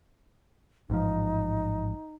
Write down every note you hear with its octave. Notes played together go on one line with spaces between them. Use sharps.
A1 G#2 F3 D#4